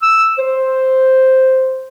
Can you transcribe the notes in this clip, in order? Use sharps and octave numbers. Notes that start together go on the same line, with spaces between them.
E6
C5